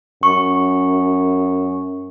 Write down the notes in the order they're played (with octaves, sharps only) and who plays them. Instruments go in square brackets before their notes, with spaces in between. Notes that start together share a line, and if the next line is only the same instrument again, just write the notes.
[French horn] F#2 [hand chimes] C#6